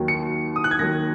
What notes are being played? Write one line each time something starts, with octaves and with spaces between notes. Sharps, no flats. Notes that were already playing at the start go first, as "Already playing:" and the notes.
Already playing: D#2 D#3 F#3
C#7
D#6
F#6
G#6
D#2 D#3 F#3 A#6